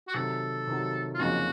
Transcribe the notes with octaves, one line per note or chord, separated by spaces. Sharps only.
F#4
C3 D#3 F#3 A4
C3 D#3 F#3
F4
F2 C#3 F#3 A#3 D#4 F#4